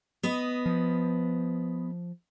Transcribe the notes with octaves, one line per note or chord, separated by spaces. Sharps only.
B3 B4 D#5
F3